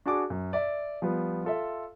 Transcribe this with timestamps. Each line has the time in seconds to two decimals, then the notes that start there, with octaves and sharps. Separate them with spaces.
0.06 D4 F#4 G#4 F#5 A5 D6
0.30 F#2
0.53 D5 E5
1.02 F3 G3 B3
1.44 F4 A4 E5